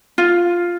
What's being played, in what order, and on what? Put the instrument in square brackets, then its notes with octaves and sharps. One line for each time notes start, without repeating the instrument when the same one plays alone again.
[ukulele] F4